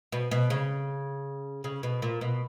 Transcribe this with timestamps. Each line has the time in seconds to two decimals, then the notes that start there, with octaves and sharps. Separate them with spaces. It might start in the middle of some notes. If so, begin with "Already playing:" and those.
0.12 B2
0.31 B2
0.50 C#3
1.64 C#3
1.83 B2
2.02 A#2
2.21 B2